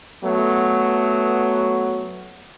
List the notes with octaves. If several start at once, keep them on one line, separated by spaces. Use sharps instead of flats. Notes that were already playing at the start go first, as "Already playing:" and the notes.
F#3 A3 B3